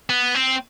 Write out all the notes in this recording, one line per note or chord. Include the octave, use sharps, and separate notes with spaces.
B3
C4